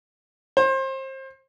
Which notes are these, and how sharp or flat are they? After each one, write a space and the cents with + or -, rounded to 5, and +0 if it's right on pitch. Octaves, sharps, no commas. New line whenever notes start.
C5 +30